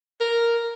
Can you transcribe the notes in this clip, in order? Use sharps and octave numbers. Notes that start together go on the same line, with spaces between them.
A#4